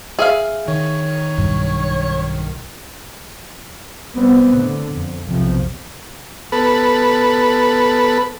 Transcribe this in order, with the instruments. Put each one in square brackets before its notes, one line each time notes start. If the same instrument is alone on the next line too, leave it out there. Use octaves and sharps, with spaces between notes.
[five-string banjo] G#4 E5 F5
[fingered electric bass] D#3 [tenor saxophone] C#5
[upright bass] B1 G2
[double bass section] C2 G3 B3 C4
A2 D3
F2
B1 F2 C3 F3
[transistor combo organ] B3 A4 B4